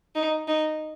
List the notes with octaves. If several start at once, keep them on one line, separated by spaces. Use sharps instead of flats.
D#4
D#4